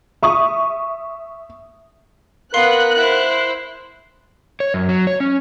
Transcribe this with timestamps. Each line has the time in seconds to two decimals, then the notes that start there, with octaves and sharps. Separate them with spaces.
0.23 E5 C#6 D#6
2.54 B3 A#4 F5 C6 F#6 C7
2.98 E4 C5 F#5
4.60 C#5
4.74 F#2
4.89 F#3
5.07 C#5
5.20 C#4